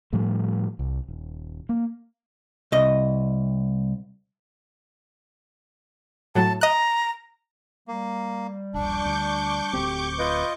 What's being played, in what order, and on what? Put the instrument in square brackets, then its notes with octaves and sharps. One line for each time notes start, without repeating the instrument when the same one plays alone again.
[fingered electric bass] A2 F3 G3 A3
C2
D#1
A#3
[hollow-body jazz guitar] C2 D#5
[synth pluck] A2 F#3 [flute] A5
[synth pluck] D#5 F#6 [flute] A#5
[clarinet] G3 [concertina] A#3
[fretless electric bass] D#1 A#1 [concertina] D4 [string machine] C#6 D6 G6
[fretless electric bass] D2
[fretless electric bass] D1 D2 C4 [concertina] G4
[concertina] F4 D#5 [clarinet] B4